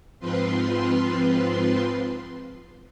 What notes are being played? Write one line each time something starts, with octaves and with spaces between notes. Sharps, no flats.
G#2 F3 C4 F4 B4 C6